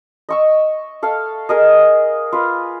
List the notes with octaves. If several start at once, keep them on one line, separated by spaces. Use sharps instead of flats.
D#5 C#6 E6
A4 F5
G#4 A#4 D#5
F4 B4